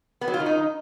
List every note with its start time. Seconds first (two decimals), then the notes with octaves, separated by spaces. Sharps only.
0.21 B3
0.28 F#3
0.34 F4
0.40 D#3
0.46 D#4